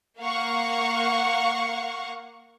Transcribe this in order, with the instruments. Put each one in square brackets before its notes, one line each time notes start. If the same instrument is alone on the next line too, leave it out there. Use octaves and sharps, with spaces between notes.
[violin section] A#3 F5 F#5 C#6